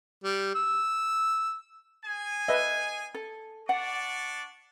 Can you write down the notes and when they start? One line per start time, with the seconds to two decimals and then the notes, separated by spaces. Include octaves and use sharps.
0.23 G3
0.55 E6
2.05 G#4 G#5
2.48 B4 D#5 E5
3.14 A4
3.69 D4 D5 F#5 C#6